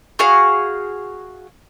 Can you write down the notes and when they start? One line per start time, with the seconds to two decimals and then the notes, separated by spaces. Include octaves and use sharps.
0.19 F#4 G#4 F5